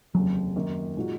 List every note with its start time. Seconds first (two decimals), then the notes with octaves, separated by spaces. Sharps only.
0.14 F1 D#2 C#3 F#3
0.55 F#2 D#3 A#3 D#4
0.97 A#2 G#3 D#4 F#4